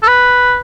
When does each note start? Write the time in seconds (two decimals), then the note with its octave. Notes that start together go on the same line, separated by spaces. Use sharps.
0.03 A4
0.07 B4